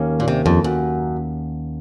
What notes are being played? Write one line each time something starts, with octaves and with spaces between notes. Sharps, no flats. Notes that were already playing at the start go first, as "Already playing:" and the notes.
Already playing: D#2 D#3 A#3 C#4
A#2
C3
F2
F#2